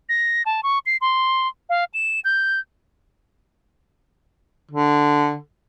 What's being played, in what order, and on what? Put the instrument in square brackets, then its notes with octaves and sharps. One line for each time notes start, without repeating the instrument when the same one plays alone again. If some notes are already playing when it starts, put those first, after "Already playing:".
[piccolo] A#6
A5
C#6
C7
C6
F5
E7
G6
[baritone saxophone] D3